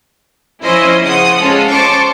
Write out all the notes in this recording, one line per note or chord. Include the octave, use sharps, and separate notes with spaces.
F3 C#4 E4 C5 D#5
C#3 C5 F#5 D#6
G#3 C#4 F4 A4
C5 C#5 A5 C#6 D6